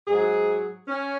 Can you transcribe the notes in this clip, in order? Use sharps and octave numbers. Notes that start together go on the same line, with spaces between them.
G#2 F#3 G#4
C#4